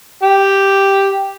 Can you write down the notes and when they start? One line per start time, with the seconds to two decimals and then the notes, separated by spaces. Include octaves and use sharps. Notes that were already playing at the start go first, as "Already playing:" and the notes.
0.23 G4